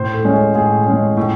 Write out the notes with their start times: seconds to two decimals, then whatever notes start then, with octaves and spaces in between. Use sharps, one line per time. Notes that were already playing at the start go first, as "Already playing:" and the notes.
Already playing: A2 C5
0.14 A4
0.25 G#3 C#4
0.34 G#4
0.55 A2 G#4
0.86 G#3 C#4
1.17 A2